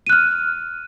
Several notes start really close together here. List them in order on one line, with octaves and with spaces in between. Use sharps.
D#7 F#6 F6